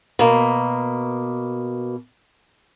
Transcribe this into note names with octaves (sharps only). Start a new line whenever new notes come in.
B2 A#3